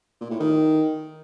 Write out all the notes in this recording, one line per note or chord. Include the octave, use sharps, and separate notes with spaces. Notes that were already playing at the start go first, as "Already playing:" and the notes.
A#2
A2
D#3